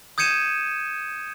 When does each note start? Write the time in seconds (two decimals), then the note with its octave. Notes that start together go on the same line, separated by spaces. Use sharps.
0.18 D#6 G6 G#6 C#7 D#7 E7